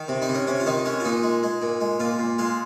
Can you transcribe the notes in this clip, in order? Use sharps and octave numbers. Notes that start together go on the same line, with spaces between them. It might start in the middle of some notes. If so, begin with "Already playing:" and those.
Already playing: D#3
C3
D#4
C3
C#4
C3 C#4
F4
D#3 D#4
G#3 C#4
F4
A#2 D#4
G#3
G#3
A#2
G#3
A#2 F4
A#2
G#3 F4